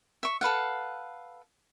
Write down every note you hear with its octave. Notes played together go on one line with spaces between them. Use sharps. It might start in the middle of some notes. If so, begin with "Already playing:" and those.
E5 C#6
A4 B4 F5 F#5